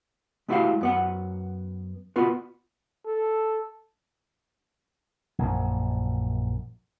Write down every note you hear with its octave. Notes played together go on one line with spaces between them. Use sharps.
G#3 A3 E4 F#4 G4 F5
F#2 B3 F#5
B3 F4 F#4 B4
A4
A#1 F#2